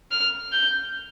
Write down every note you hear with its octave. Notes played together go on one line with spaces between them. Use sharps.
F6
G6